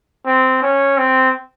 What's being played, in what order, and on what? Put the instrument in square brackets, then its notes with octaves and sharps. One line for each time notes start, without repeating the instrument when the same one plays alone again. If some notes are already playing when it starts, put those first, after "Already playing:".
[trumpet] C4
C#4
C4